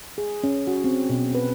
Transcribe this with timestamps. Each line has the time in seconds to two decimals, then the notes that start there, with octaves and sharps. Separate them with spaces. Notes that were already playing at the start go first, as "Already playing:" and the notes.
0.18 G#4
0.44 C#4
0.67 F#4
0.84 C4
1.10 B2
1.35 B4